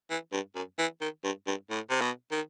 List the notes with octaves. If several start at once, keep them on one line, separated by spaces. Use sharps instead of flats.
E3
G2
F#2
E3
D#3
G2
G2
A2
C3
B2
D#3